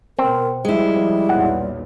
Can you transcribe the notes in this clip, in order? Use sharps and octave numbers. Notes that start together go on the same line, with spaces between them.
B2 C4 A#4
F3 G3 G#3 E4
B1 E2 A#2 F#5